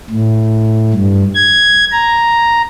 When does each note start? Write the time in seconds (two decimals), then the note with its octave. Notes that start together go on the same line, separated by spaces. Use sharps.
0.10 A2
0.94 G2
1.35 G#6
1.91 A#5